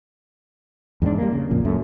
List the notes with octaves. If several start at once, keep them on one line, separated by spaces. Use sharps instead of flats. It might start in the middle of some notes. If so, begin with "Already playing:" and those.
E2 G#2 C4 D4
G3 A#3
C#3
A#1 F2 A#2
C#2 F#2 A3